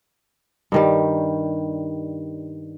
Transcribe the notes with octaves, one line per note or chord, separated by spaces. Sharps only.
G2 D#3 G3